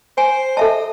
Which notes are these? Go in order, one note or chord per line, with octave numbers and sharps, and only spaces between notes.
C5 G#5
A4 D#5 E5 A5